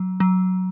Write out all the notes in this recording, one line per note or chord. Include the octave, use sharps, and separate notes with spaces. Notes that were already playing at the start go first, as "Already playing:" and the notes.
Already playing: F#3
F#3